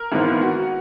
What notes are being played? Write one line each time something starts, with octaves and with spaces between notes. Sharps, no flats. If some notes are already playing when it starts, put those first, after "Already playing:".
Already playing: A#4
G#1 G#2 E3 B3
F#4